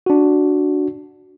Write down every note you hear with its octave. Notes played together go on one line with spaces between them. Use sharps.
D4 F#4